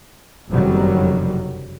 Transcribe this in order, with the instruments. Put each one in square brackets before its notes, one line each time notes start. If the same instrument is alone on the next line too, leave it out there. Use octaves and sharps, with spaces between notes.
[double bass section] F#1 F2 C3 D#3 F#3 G3